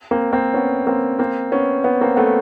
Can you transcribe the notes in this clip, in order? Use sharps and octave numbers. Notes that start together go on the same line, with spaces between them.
A#3 C4
A#3 C4
B3 C#4
A#3 C4
A#3 C4
B3 C#4
B3 C#4
A#3 C4
A3 B3